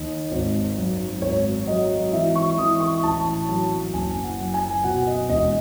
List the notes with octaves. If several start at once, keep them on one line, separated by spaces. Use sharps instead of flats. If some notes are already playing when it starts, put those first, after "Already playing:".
Already playing: D#2 D#3 D#5
G#1
F#2
G#1 C#5
F#3 D#5
E3 E5
C#6
E3 D#6
C#6
A1 A5
F#3
F#1 G#5
F#5
F#2
G#5
B2 F#5
D#5
E1 D#5